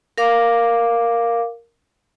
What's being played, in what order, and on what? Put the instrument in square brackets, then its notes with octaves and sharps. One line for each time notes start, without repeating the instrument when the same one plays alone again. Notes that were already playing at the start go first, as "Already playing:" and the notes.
[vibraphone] A#4 F5 D6